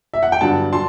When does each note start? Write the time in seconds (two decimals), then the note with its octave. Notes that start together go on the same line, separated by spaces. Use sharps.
0.14 E5
0.23 F#5
0.32 G5
0.41 G2 D3 F#3 F#5 A5
0.72 F#3 A5 C6